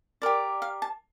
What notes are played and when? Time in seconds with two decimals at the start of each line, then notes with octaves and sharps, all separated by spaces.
0.22 G4 A#4 D5
0.62 F5
0.82 A5